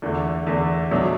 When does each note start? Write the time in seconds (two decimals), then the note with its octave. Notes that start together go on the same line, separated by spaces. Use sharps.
0.02 E2 D3 A3
0.47 E2 D3 A3
0.91 B2 F#3 A3 D4